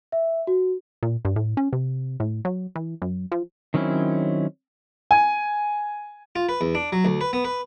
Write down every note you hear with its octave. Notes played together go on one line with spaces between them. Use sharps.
E5
F#4
A#2
G2
A2
C#4
C3
A2
F#3
E3
F#2
F3
D#3 F#3 C4 C#4 E4
G#5
F4
B4
E2
D4
F#3
D2
B4
B3
B4